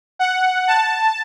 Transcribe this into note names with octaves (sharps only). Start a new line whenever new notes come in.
F#5
A5